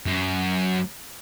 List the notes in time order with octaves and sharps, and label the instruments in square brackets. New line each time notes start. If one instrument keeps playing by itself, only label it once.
[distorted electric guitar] F#2